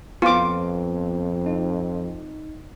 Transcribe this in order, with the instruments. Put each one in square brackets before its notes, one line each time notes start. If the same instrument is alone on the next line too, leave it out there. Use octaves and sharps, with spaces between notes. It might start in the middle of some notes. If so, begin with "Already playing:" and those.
[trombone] F2 [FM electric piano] B3 [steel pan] F4 D6
[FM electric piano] D#4